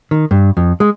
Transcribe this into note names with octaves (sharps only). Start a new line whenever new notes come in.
D#3
G2
F2
G#3